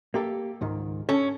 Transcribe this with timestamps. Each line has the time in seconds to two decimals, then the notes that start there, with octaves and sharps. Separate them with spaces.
0.14 A#3 G4 A4
0.61 C#2 G#2 D#3
1.09 C#4 A4